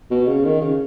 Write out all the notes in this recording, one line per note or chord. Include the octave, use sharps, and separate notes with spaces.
B2
C#3
D#3
C#3